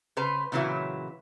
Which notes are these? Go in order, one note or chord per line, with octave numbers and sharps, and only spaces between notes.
C#3 B4 C5 A#5
A#2 C#3 E3 F#3 E4